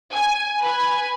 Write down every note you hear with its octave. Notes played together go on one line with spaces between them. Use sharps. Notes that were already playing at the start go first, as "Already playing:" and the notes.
G#5
B4 G#5